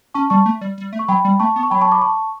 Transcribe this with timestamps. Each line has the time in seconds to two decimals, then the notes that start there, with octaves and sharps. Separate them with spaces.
0.14 C#4 A5 C#6
0.30 G3 A5 C#6
0.46 A3
0.61 G3
0.78 G3
0.93 A3
0.99 C#6
1.08 F#3 G5 B5
1.25 G3
1.40 A3 A5 C#6
1.56 B3
1.63 C#6
1.70 F#3 G5 B5
1.81 A5 C#6
1.92 B5 D6
2.02 A5 C#6